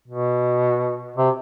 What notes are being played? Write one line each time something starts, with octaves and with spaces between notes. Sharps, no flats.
B2
C3